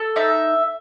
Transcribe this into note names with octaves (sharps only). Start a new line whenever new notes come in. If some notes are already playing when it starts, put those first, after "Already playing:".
Already playing: A4
D#4 E5